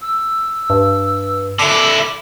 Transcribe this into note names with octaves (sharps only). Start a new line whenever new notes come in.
E6
G2
D3 E4 D6